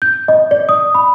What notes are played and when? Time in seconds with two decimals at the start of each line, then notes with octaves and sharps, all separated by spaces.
0.02 G6
0.28 D#5
0.51 D5
0.69 D#6
0.95 B5